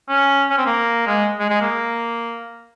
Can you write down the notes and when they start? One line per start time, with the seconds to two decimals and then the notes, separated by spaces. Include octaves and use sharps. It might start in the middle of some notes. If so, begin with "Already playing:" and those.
0.09 C#4
0.50 C#4
0.58 C4
0.66 A#3
1.07 G#3
1.39 G#3
1.50 G#3
1.61 A#3